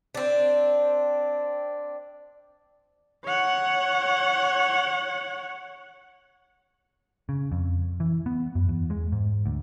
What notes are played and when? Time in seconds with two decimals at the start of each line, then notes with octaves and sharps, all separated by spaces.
0.15 C4 D4
3.25 C#5 F#5
7.29 C#3
7.52 F2
8.00 E3
8.26 B3
8.55 F#2
8.69 E2
8.90 G#3
9.12 G#2
9.46 D2